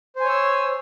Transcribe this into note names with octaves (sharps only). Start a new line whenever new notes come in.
C5 C#5 G#5 E6